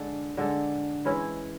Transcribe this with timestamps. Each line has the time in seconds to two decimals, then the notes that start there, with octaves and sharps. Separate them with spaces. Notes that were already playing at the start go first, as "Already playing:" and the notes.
Already playing: D3 G#3 D4 A4
0.37 D3 G#3 D4 A4
1.05 E3 G#3 C#4 E4